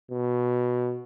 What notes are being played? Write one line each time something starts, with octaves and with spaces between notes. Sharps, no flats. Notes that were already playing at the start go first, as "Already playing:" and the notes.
B2